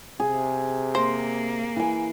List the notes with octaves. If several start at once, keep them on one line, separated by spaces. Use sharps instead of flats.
C3 G#4
A#3 C5
E3 G#5